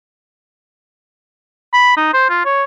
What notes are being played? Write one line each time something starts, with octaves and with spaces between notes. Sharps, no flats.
B5
D#4
C5
F4
C#5